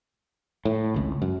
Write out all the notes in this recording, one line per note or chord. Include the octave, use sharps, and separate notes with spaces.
A2
G#1 C#2
F#2